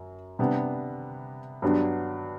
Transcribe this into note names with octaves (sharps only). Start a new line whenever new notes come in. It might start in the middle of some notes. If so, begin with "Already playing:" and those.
Already playing: F#2
C3 G3 B3 D4
G2 F#3 B3 D4